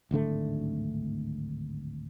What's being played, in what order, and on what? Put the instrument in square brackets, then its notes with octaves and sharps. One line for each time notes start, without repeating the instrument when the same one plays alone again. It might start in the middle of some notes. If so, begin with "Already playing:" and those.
[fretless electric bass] D1 G#1 D3 A3